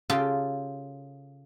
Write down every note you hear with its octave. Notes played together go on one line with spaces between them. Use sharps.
C#3 F4 G4 A4